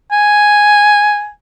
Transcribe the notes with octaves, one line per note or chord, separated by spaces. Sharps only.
G#5